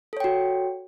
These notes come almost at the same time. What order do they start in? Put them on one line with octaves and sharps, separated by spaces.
A4 C#5 G5 F#4